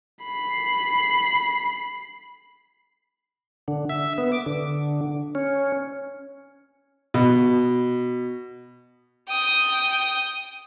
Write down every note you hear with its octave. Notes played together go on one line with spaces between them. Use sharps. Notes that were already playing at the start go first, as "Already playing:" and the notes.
B5 C7
D3
E5
B3
D6
D3
C#4
B2
G5 D#6